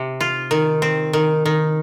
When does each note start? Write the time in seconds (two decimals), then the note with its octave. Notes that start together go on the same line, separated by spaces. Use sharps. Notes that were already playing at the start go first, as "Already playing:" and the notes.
Already playing: C3
0.21 F4
0.51 D#3
0.82 C4
1.13 D#3
1.45 D#3